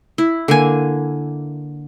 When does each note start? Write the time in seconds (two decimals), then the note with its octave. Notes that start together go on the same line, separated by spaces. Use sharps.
0.18 E4
0.48 D3 A#3 G#5